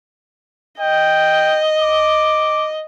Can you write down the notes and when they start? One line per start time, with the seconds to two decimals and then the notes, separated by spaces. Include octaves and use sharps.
0.80 D#5 G5
1.81 D6